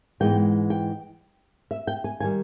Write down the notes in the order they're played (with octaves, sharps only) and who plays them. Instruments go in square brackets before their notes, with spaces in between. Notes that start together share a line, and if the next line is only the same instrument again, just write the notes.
[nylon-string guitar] G#2 E3 G#3 B3 G5
G5
E5
G5
G#5
D#3 G3 G#5